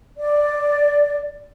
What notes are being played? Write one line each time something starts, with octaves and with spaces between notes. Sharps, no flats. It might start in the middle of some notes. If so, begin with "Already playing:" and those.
D5